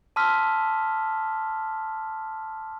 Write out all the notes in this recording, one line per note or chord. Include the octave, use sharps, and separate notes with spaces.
A5 C6 D6 E6 F6 B6